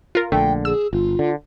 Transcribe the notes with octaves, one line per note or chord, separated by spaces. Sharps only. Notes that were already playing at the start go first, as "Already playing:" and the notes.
F4 A#4
A#1 D3 A3 G5
G#4 E6
G1 F4
D3